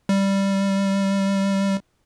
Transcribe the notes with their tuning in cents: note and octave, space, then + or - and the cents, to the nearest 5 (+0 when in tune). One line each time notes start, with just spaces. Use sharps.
G3 +0